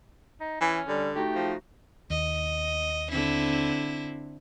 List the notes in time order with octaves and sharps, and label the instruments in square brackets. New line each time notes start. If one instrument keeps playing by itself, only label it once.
[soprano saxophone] D#4
[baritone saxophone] E3 [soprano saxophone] C#4
[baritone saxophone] D3 [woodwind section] G3
[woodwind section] A3 D#4 F#4 [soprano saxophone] G4
[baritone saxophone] F3
[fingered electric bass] D#2 [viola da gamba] D#5
[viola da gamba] D3 C4 E4